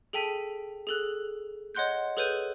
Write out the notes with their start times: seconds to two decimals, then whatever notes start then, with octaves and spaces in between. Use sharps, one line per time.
0.13 G#4 A4 G5 A5 B6 D#7
0.87 G#4 A4 F#6
1.75 C#5 D#5 F#5 C6 F#6 G6
2.17 G#4 A4 B4 C#5 G6 D#7